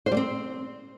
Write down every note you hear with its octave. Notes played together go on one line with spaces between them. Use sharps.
C5
G3
C4